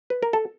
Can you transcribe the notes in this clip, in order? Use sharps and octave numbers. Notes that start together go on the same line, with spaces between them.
B4
A#4
A4